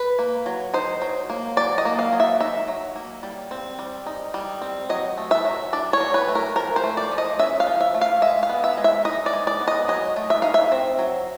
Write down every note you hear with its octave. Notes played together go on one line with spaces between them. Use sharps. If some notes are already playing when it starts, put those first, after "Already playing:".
Already playing: B4
A#3
F#3
D#4 C5
F#3
A#3
F#3 D5
D#5
A#3
F5
F#3
E5
D#4 E5
F#3
A#3
G3
C4
G3
D#4
G3
C4
F#3 D#5
A3
E5
F#3
D4 D5
C#5
F#3
B4
A3
A#4
F3 A#4
C5
A3
D5
F3
D#5
C#4 E5
F5
F3
E5
A3
F5
G#3 E5
F5
B3
E5
G#3
E5
D#4 D#5
D5
G#3
D5
B3
D#5
F#3 D#5
A3
E5
D#4 F5
E5
C4
F#3